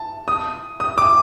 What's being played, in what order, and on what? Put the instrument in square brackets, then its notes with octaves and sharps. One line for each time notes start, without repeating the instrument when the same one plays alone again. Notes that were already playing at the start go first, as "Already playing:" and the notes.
Already playing: [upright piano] A5
D#6
D#6
D6